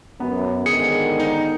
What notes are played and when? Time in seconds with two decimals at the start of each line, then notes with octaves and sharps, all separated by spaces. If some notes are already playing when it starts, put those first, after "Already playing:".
0.20 F#2 B3
0.66 G#2 D3 D#3 G#4 C#7
1.20 D#4